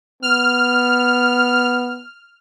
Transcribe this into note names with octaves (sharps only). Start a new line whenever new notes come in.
B3 F6